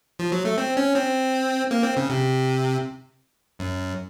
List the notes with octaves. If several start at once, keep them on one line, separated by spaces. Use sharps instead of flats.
F3
F#3
A3
C4
C#4
C4
A#3
C4
C#3
C3
F#2